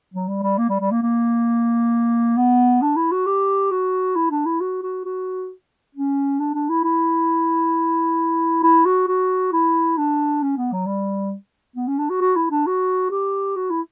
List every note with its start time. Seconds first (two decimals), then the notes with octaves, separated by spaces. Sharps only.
0.14 F#3
0.28 G3
0.43 G3
0.58 A#3
0.69 G3
0.80 G3
0.91 A#3
1.02 A#3
2.37 B3
2.82 D4
2.96 E4
3.12 F#4
3.26 G4
3.71 F#4
4.16 E4
4.31 D4
4.46 E4
4.61 F#4
4.83 F#4
5.05 F#4
5.95 C#4
6.39 D4
6.54 D4
6.69 E4
6.84 E4
8.63 E4
8.86 F#4
9.08 F#4
9.53 E4
9.98 D4
10.42 C#4
10.57 B3
10.72 F#3
10.87 G3
11.76 B3
11.88 C#4
11.98 D4
12.10 F#4
12.21 F#4
12.36 E4
12.51 D4
12.66 F#4
13.10 G4
13.56 F#4
13.70 E4